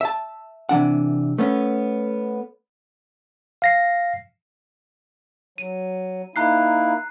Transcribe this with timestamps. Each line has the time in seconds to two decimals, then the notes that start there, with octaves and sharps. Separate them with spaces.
0.01 E5 A5
0.69 C3 E3 D4 F#5
1.38 A3 B3 C#4
3.62 F5 A#6 C7
5.58 F#3 D#7
6.36 A#3 D#4 E4 A#5 F#6 C7